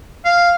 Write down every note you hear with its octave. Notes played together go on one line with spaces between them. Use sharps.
F5